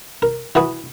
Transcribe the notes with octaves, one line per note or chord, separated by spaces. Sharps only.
A#4
E3 F#4 B4 D#6